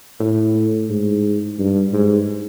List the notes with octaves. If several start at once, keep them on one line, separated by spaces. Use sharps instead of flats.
A2
G#2
G2
G#2